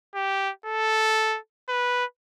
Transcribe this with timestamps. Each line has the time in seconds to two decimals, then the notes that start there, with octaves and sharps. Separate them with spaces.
0.15 G4
0.66 A4
1.69 B4